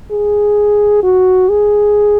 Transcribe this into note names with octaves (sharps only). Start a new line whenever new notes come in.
G#4
F#4
G#4